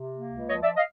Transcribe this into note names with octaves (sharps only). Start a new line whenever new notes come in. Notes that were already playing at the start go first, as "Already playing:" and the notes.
Already playing: C3
A#3
C#2
F3 C#5 D#5
D5 E5
D#5 F5